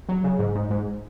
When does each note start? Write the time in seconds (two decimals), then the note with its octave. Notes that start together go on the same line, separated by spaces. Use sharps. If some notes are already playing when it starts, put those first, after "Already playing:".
0.09 F#3
0.24 C#3
0.39 G#2
0.55 G#2
0.70 G#2